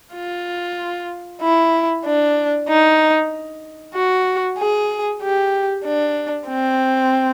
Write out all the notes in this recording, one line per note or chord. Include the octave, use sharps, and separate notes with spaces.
F4
E4
D4
D#4
F#4
G#4
G4
D4
C4